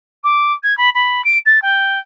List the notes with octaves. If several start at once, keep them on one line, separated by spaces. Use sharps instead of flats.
D6
G#6
B5
B5
D7
A6
G5